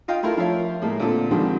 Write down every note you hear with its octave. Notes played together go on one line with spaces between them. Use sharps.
F4 D#5 F5 G5
A3 E4 F4 A#4
F3 F4 A#4 C#5 E5 F5
A2 G#3 A#3
A#2 D3 C4 A4
D3 D#3 F3 G3 G#3 C4